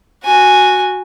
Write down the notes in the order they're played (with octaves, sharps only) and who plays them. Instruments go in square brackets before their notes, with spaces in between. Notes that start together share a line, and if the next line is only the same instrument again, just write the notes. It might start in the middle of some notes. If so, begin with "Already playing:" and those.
[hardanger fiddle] F#4 G#5